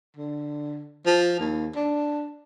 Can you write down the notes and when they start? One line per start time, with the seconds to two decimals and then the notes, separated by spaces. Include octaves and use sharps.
0.16 D3
1.06 F3
1.39 D#2
1.76 D4